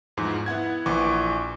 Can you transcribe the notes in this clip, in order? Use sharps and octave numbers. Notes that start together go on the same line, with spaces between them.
E2 G#2 F3
B3 E4 F#5 G#6
A#1 E3 C#6 D6